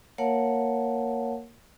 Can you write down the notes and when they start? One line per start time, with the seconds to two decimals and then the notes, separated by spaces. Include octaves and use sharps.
0.18 A#3 A#4 C#5 F5 F#5 A5